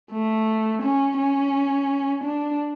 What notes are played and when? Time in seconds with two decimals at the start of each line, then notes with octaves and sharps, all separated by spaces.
0.11 A3
0.82 C#4
1.18 C#4
2.24 D4